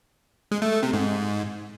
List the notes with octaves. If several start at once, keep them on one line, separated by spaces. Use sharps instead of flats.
G#3
A3
A3
C3
G#2